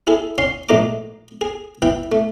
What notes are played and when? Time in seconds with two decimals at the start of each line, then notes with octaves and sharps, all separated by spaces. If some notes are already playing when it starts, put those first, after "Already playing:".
0.07 E4 G#4 A4
0.38 C#4 F5 C6
0.69 A#1 G#2 A3 D#4 A#5 D6
1.41 G#4
1.82 E3 E5 G5 B5
2.12 A3